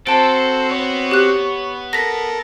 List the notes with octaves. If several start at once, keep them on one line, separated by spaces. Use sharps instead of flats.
C4 F#4 A4 C5 A5 D7
B3 C#5
G4 F#6
A4 A#4 A#6 B6